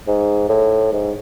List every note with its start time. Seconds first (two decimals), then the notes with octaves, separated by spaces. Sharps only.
0.07 G#2
0.49 A2
0.92 G#2